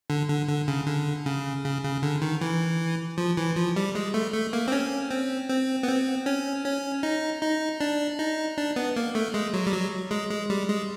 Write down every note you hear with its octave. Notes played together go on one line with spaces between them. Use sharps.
D3
D3
D3
C#3
D3
C#3
C#3
C#3
D3
D#3
E3
F3
E3
F3
G3
G#3
A3
A3
A#3
C4
C#4
C4
C4
B3
C4
C#4
C#4
D#4
D#4
D4
D#4
D4
B3
A#3
A3
G#3
F#3
G3
F#3
G#3
G#3
G3
G#3